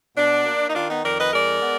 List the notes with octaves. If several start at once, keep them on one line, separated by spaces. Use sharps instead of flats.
B2 D4
A#3
D#4
D#3 D4 F4
B3 D#4
F2 A#4 D5
B4 D#5
G#3 A#4 D5
B3